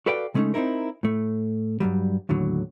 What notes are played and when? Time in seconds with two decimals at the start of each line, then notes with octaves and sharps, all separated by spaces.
0.06 F#4 A4 B4 D5 F5 G5
0.34 C#3 G#3 A3 C4 C#4 D#4
0.54 C4 C#4 D#4 E4 A#4
1.03 A2 A3
1.80 G2 A#2 F#3 G3
2.29 D#2 A2 D3 F#3